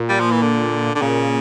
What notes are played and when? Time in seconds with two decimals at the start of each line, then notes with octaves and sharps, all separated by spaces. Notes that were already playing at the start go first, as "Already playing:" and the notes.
Already playing: A#2
0.09 G3
0.20 F3
0.31 E3
0.42 D3
0.95 D3
1.02 A#2 C#3